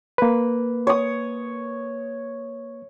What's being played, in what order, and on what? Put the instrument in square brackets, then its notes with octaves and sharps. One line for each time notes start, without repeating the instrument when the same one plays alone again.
[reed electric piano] A#3 B4
[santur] C#5 D#6